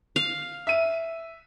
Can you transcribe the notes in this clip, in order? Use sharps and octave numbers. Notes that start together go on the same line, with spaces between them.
F5
E5 D#7